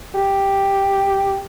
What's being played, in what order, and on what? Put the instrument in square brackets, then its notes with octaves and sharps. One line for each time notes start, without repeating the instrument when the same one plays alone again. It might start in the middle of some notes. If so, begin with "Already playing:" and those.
[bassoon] G4